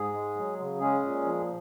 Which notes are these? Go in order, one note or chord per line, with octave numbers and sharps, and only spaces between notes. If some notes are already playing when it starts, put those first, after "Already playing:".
Already playing: G#2 G#4
G#3
F#3
C#3
G#3 C#4 G#4
A#2
F3